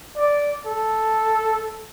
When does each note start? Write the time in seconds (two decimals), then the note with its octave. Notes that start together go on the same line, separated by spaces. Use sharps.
0.17 D5
0.67 A4